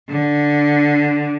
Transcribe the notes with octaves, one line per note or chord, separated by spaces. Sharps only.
D3